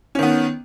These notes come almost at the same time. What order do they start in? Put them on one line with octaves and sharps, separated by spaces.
C#4 D#3 B3